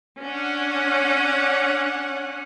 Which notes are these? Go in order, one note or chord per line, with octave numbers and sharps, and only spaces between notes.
C#4 D4 F#5